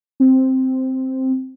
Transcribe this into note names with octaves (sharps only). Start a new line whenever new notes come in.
C4